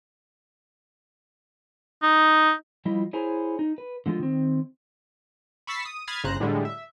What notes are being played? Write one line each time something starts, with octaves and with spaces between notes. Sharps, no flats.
D#4
F3 G3 E4 F4 D#5
E4 G#4 C5 C#5 G#5 A#5
D#4
B4
D3 F3 G#3 F4
D#3 C4
B5 C#6 E6 A6 B6 C7
D#6
B5 D#6 F6 G#6 A6 C7
G1 C#3 C5 A#5 F#6
A2 D3 G3 G#3
E5